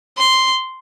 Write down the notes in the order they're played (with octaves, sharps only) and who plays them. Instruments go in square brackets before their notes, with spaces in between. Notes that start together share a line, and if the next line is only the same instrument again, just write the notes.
[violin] C6